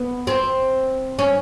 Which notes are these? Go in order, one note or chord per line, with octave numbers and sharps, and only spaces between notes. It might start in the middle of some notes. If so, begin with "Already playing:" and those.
Already playing: B3
C4
C#4